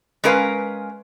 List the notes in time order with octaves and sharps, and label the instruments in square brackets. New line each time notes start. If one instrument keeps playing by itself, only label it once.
[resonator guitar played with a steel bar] G#3 C#4 A#4 B4 F5